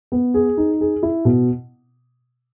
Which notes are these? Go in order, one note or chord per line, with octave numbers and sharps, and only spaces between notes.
B3
G#4
D#4
G#4
E4
B2